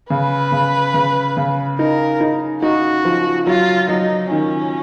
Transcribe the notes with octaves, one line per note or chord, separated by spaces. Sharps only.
C#3 B4
C#3
C#3
C#3
D#4 A#4
D#4
D#4 F#4
F3
F#3 F4
F#3 D#4
D#3 C#4